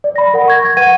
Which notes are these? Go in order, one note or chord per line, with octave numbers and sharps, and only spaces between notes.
D5
B5 A#6
A#4 F#5
C#6 G#6 A#6
C#6 G#6
B4 F#5 G#6 D#7